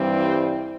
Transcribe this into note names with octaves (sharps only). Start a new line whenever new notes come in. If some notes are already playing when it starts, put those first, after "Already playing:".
Already playing: G2 E3 G3 C4
C5